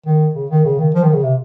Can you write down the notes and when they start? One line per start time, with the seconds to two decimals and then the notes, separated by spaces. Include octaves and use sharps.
0.06 D#3
0.35 C#3
0.50 D#3
0.65 C#3
0.78 D#3
0.94 F3
1.03 D#3
1.13 C#3
1.23 C3